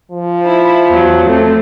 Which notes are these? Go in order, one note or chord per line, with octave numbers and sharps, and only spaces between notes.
F3
E4
E2 F#3
A3 C4